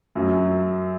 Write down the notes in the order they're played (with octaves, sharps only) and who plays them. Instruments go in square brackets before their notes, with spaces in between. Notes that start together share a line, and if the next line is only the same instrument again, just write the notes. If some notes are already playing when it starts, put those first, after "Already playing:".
[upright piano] F#2 F#3